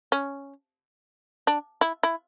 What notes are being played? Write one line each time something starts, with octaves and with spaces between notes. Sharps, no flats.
C#4
D4
E4
E4